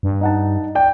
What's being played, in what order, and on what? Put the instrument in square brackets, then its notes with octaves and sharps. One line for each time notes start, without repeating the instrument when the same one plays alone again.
[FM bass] G2
[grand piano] D#4 F#5 A5
D5 G5